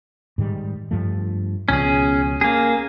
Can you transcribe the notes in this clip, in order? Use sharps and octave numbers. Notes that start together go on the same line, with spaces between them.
G#2 D#3 G3
G2 F3 A3
C#2 B2 F3 C#4 G#4
A#3 C#4 G#4